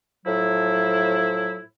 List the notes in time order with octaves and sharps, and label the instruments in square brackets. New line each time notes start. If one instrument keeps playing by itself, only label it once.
[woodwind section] A2 F3 F#3 E4